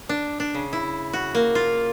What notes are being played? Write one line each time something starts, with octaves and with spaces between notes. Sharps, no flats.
D4
D4
C#3
E4
F#4
A#3
F4